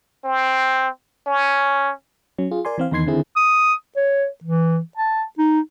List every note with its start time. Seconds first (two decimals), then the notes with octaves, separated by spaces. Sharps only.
0.25 C4
1.27 C#4
2.38 F#3 C#4
2.51 F4 G#4
2.65 A#4 D5 G#5 C6
2.78 E3 C4 F5
2.91 E2 D#3 D#4 C6 G#6 C7
3.06 D3 D#3 C4 E4 G#4
3.36 D#6
3.96 C#5
4.44 E3
4.97 A5
5.39 D#4